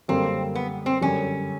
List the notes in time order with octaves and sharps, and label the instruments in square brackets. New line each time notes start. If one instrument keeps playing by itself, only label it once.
[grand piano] F#2 D3 G3 A#3 [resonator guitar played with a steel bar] C4
[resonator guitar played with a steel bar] B3
C4
[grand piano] F#2 D3 G3 [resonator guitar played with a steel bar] C#4